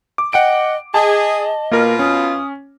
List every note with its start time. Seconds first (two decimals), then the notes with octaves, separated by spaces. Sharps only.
0.18 D6
0.33 D#5 F#5 G5 D7
0.94 G#4 D#5 A5
1.71 B2 A#3 F4 A#4
1.99 C#4 D#6